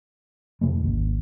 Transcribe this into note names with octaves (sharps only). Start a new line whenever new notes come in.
F2 C3 F#3 A3
G#1 D#2